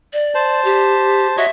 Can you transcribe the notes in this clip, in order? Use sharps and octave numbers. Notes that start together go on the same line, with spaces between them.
D5
C5 A5
G4
F#4 C#5 D#5 E5